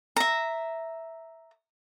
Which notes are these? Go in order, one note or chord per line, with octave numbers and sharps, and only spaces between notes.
E5 A#5